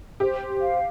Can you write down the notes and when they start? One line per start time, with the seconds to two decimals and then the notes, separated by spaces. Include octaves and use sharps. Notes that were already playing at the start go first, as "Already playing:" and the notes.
0.20 G4 C5
0.41 C5
0.61 F5